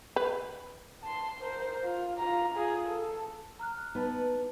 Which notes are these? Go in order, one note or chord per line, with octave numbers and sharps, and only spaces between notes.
B4
A5 C6
A#4 C5
F4
F4 A#5
F4 G#4
A4
A#5 F6 F#6
B3 D#4 B4 A5